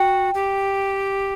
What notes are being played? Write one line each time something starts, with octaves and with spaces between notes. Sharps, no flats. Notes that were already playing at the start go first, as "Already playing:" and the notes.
Already playing: F#4 G5
G4